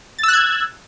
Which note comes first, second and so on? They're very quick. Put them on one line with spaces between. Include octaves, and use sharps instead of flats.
A6 E6 F#6 G#6